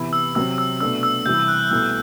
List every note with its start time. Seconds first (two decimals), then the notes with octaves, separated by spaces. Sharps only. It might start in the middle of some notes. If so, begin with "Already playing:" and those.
Already playing: C3 E3 B3 E4
0.13 E6
0.35 C3 F#3 C4 E6
0.58 E6
0.81 B2 A3 D4 E6
1.03 E6
1.26 C3 E3 G3 G6
1.48 F#6
1.71 C2 B2 A3 E6